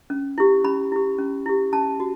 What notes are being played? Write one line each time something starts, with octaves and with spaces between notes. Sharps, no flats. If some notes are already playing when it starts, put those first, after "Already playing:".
C#4
E4 G4
C#4 B5
E4 G4
C#4
E4 G4
C#4 A5
F#4